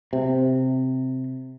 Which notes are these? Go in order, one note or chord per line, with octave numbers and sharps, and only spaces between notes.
C3